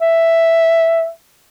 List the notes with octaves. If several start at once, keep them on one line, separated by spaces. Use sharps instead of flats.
E5